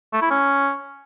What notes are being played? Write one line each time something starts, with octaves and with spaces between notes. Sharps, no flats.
A3
E4
C#4